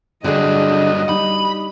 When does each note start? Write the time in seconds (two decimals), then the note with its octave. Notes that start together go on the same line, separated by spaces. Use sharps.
0.24 G2 D3 F#3 D4 G#4 D#5
1.09 G3 D#4 B5